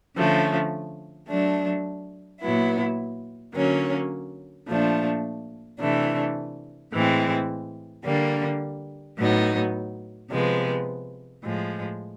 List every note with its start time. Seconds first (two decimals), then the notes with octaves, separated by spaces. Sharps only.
0.15 D3 F3 A3 C#4
1.27 F#3 A3 D4
2.40 A#2 F#3 B3 E4
3.54 D3 F#3 A#3 C#4
4.66 A#2 F3 A3 D4
5.79 C3 E3 A3 D4
6.92 A2 E3 G#3 C4
8.04 D3 G3 A#3
9.18 A2 F#3 B3 D#4
10.30 C3 F3 G#3 B3
11.43 A2 F3 G#3